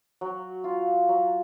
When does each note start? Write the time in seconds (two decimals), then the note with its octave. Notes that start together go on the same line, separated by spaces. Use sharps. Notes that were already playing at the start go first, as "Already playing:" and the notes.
0.21 F#3
0.64 F4
1.09 F#3